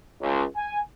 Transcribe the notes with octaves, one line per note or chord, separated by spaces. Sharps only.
C#2
G#5